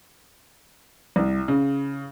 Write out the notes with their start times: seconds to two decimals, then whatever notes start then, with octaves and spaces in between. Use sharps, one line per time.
1.16 C2
1.48 C#3